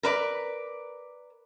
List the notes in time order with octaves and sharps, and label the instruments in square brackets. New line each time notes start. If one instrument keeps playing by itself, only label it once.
[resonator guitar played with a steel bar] A#4 B4 D5